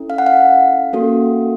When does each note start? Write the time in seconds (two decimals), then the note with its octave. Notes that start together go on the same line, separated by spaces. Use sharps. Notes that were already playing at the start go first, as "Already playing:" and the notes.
Already playing: C#4 E4 A4
0.10 F5
0.18 F#5
0.26 F5
0.93 A#3 C#4 F#4 A4